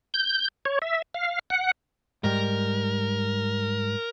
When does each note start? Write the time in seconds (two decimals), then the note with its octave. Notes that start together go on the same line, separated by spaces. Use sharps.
0.14 G6
0.65 C#5
0.82 E5
1.14 F5
1.50 F#5
2.24 G#2 G3 A#4